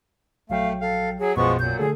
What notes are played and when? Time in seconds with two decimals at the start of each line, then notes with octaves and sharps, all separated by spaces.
0.50 A#1 F#3 A3 F5 G5
0.81 A4 F5
1.19 F#3 G#4
1.36 B1 F#2 B2 F3 G#3 B3 C#6
1.59 A#2 F#3 G6
1.79 D3 A3 G#4 A4